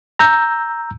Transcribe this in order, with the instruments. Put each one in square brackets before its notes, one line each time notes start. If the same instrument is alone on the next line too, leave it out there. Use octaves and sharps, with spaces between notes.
[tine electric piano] A#5 E6 G6